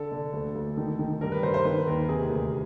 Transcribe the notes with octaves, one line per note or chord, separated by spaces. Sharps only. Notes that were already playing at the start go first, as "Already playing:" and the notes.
Already playing: D3 A4
D3
D2
D2
D#3
D#3
G2 A#4
B4
D3 C5
C5
D#3 B4
D#2 A#4
C3 G#4
D2